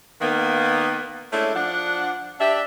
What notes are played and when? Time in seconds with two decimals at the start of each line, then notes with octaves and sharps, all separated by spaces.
0.20 D#3 A#3 B3
1.32 G#3 A3 C#4 D4 E4 A4
1.55 F3 D4 F#5
2.40 D4 G4 E5